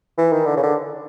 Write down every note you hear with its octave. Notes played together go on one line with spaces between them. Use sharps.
E3
D#3
D3
C#3
D3